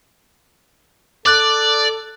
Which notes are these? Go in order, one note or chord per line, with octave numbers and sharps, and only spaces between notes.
A4 D5 D6 F#6 A6